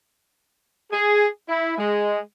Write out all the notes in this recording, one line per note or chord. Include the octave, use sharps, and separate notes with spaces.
G#4
E4
G#3